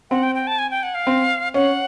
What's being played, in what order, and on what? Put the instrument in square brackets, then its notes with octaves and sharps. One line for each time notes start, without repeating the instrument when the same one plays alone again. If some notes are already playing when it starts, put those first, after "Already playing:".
[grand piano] C4 [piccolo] F#5
[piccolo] G5
G5
A5
G#5
G5
F#5
F5
[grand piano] C4
[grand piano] C#4 [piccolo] F#5